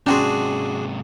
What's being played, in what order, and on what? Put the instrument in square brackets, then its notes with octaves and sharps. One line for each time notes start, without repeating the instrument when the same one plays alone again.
[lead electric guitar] G#2 C3 [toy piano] C#4 G5 C6 [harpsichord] D4 F#4 G#4